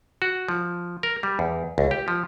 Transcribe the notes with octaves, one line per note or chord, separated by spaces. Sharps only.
F#4
F3
A#4
G3
E2
C#2
G4
F3